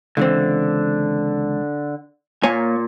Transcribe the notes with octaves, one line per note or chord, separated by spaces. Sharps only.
C#2 D3 E3 C4
A#2 A#3 C#5 G#5